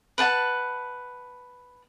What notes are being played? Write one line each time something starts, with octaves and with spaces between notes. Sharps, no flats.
B4 F#5 A5